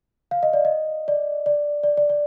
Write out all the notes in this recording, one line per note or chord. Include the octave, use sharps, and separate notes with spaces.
F5
D#5
D5
D#5
D5
D5
D5
D5
D5